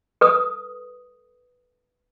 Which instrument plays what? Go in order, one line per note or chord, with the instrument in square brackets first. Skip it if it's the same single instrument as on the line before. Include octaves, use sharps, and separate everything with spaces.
[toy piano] A4 B4 D#6